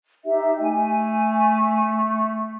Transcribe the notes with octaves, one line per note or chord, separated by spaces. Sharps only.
D#4 G4 E5
A3 G#5